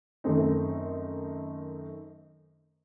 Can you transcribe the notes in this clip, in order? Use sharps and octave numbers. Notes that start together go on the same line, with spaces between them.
F#2 D#3 A3 C4 D#4